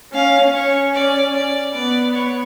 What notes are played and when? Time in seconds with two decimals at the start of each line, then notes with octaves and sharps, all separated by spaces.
0.13 C#4 F5
0.54 C#4 C#5
0.94 D5
1.35 D5
1.74 B3 D5
2.14 C#5